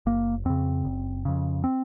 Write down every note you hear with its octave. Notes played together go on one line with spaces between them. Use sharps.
F#1 A#3
F2 C#3 C4
F#1
F2 C#3
C4